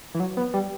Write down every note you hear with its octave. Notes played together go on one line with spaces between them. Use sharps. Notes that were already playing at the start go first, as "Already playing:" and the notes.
E3
F#3
B3
G3